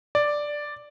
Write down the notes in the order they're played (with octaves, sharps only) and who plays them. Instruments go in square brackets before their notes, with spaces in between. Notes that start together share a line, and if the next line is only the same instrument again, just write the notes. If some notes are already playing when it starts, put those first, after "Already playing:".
[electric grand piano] D5